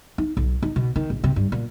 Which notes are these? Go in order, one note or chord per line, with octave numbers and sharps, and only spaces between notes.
D#4
B1
D#4
B2
D#3
A#1
C3
G2
A#2